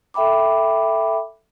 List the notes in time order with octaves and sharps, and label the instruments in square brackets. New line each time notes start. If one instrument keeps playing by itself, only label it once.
[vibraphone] A4 E5 G5 B5 D6